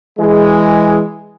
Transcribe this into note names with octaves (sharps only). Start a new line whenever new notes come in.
E3 G#3